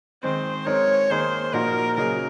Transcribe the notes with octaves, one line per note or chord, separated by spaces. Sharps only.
D#3 G#3 C4 C5
G#3 C4 D#4 A#4 C#5
D#3 A#3 D#4 G#4 C5
A#2 F3 A#3 D#4 F#4 A#4
C#3 F#3 A#3 D#4 G#4 A#4